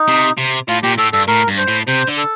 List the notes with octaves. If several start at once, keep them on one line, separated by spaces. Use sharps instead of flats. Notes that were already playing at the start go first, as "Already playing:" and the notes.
Already playing: D#4
C3
C3
A2 F4
A#2 G4
A2 A4
G2 A4
A2 A#4
G2
C5
A2
C3 C5
D3
A4